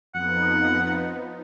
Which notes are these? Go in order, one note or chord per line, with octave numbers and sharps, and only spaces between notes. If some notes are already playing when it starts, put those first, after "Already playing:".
F2 F3 B3 D#4 F#5